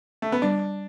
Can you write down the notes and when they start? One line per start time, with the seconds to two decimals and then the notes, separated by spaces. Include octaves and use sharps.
0.22 A3
0.32 B3
0.42 G3 D4